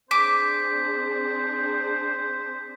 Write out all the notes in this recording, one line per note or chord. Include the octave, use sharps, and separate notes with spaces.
C4 D4 G#4 C5 D6 B6